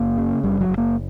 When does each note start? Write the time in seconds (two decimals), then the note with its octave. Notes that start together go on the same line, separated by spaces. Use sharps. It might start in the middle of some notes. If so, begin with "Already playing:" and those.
Already playing: F#1 A#3
0.18 C#3
0.43 F#1 G3
0.61 F#3
0.69 F#1
0.78 A#3